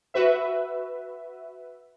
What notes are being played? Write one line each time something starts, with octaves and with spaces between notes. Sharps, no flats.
F#4 B4 E5